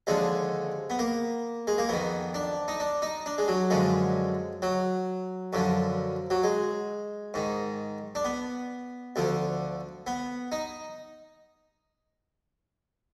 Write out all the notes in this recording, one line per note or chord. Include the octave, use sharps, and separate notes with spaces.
D#2 D3 F3 G#3
B3
A#3
G#3
A#3
F2 D#3 B3
D4
D#4
D4
D#4
D4
G#3
F#3
F#2 D3 F3 G#3
F#3
F#2 D3 F3
F#3
G#3
G#2 D#3
D4
B3
D2 D3 F3
B3
D#4